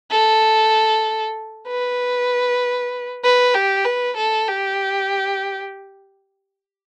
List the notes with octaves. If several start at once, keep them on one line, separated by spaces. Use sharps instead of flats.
A4
B4
B4
G4
B4
A4
G4